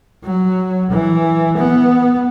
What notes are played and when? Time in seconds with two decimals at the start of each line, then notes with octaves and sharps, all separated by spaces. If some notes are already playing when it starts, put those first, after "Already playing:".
0.23 F#3
0.91 E3
1.57 B3